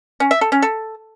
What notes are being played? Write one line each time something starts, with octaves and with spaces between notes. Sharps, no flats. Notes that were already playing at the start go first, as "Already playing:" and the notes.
C#4
E5
A4
C#4
A4